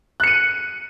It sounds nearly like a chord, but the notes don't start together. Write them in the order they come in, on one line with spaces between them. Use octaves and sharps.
F#6 C#7 D#7